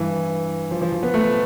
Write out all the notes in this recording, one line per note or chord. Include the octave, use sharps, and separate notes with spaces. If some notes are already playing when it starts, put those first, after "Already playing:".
Already playing: G2 E3
F3
F3
F3
B3
A3